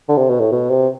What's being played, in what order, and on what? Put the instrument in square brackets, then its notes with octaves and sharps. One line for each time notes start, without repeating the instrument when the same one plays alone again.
[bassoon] D3
C3
B2
A2
B2
C3